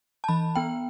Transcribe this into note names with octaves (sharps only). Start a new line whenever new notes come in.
A5
E3 B5
B3 G5